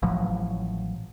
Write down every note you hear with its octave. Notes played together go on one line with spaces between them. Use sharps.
A1 A2 F3 F#3